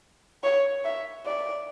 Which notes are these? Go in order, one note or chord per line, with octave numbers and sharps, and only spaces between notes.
C#5
E5
D5